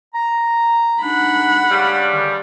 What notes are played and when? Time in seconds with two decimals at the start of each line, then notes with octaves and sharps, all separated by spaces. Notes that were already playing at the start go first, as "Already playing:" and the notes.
0.14 A#5
1.02 D4 D#4 F#5 B5
1.71 G2 C#3 G3
2.09 D3 D#3